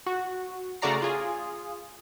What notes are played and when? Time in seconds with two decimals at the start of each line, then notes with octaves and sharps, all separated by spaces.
0.06 F#4
0.82 C#3 A3 F#4 D5 A#5 C7
1.02 F4 G#4